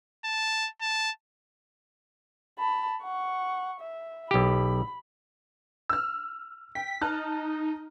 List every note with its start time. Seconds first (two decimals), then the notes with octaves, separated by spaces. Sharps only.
0.25 A5
0.81 A5
2.58 A5 B5
3.02 F#5 C#6
3.81 E5
4.31 B1 G4 B5
5.89 E6 F6
6.75 G5 B6
7.01 D#4 A5 F6 F#6